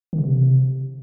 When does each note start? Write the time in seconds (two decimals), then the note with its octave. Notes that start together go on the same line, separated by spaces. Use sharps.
0.13 D#3
0.18 C#3
0.24 C3